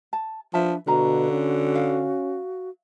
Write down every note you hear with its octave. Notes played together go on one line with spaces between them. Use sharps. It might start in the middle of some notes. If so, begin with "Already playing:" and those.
A5
F3 D4 B4 E5 A5
B2 D3 F#4 B4 F5 A#5
C#4
F5